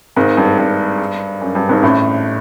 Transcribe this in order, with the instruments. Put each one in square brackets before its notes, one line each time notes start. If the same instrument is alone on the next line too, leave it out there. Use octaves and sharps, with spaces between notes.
[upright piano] G#1 G#2
G2
G2
F#2
G2
G#1 G#2
A1 A2